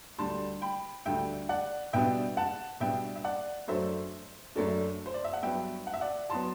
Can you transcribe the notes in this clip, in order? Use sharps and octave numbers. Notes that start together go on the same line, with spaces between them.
D2 D3 G3 A5 C6
G5 B5
D2 D3 G3 E5 G5
D5 F#5
B2 G3 B3 D4 E5 G5
F#5 A5
B2 G3 B3 D4 E5 G5
E5
D5 F#5
F#2 F#3 A3 D4 C5 E5
F#2 F#3 A3 D4
C5
D5
E5
F#5
G2 F#3 B3 E5 G5
F#5
E5
D5 F#5
F#3 B3 A5 C6